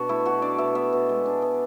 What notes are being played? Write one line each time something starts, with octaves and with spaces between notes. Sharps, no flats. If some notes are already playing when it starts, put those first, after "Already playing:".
Already playing: B2 D4 F#4
A3 E4
B2 F#4
D4 D5
B2 E5
B3 E5
B2
G#3
D4
B3